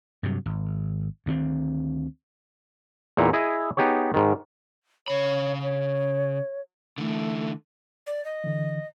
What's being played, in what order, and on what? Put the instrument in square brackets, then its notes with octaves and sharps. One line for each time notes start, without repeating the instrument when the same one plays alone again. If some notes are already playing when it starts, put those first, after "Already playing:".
[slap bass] G2 C3 F#3
G#1
D2 D#3 A#3 C4
[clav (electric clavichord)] E2 A#2 D#4 E4
E4 G#4 D#5
B3 D#4 G4 G#4 C#5
G#2 D#3
[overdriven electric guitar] C#3 B5 [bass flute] C#5
[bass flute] C#5
[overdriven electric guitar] D3 E3 [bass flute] A3
[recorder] D5
D#5
[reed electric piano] D3 E3